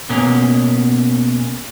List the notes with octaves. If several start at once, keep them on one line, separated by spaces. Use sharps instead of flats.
B2 A#3 C#4 A#5